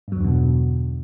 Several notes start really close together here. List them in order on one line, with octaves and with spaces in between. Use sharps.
G2 F#3 E2 D3 B2